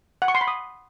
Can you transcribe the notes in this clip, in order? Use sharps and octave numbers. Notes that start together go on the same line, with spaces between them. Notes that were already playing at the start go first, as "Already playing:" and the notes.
F#5
C#6
C6
B5
D#6